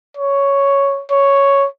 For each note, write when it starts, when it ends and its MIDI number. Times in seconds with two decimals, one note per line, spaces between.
0.17 1.03 73
1.11 1.66 73